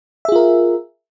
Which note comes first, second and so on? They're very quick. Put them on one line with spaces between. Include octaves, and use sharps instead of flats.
E5 G#4 F4 A#4